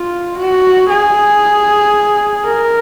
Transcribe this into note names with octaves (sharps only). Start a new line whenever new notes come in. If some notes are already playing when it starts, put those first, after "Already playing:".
Already playing: F4
F#4
G#4
A#4